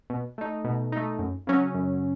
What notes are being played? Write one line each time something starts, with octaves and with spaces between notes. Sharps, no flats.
B2
A3 D#4
B2
A3 D#4
F#2
C#3 F#3 C#4
F#2